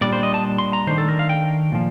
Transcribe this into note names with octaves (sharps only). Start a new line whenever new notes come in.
A#2 G3 D4 D5
C5
D#5
A5
C6
A#5
D#3 A3 D4 C5
A4
A#4
F5
G5
A#2 F3